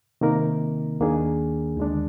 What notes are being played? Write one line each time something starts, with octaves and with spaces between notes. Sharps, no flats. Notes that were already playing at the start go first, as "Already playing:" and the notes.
C3 D#3 A#3 D#4 A#4
D#2 D#3 A#3 D4 G#4
D#2 D3 G#3 D4